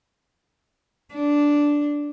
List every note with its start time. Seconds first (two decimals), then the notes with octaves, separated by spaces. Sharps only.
1.14 D4